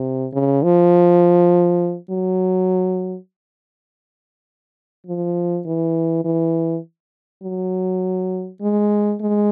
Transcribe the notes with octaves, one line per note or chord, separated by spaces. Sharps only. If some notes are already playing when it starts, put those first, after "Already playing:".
Already playing: C3
C#3
F3
F#3
F3
E3
E3
F#3
G#3
G#3